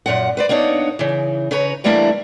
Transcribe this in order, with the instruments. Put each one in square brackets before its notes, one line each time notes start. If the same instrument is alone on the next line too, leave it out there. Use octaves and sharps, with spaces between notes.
[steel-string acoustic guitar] F#2 A#2 F#5
B4 C5 D5
A#3 B3 D4 D#4 C#5
C#3 E3
C#3 B4 C#5 A#5
E3 G3 A3 A#3 D4 E4